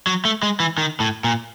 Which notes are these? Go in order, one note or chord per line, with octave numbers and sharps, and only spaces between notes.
F#3
A3
G#3
E3
D#3
A2
A#2